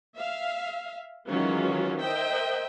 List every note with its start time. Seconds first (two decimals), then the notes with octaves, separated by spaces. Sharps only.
0.17 E5 F5
1.28 D#3 E3 F#3 G#3 C#4 F4
2.02 A#4 C5 D#5 E5 G5